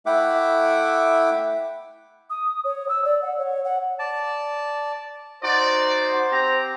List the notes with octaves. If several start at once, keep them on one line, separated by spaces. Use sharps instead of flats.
A3 E4 E5 F#5 G5 D6
D#6
C#5
E6
D5
F#5
C#5
F#5
D5 A5
D#4 F#4 C5 D5 D6
C4 G4 A#5